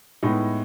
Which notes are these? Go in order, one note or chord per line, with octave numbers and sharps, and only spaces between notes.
A2 G#3 B3 D#4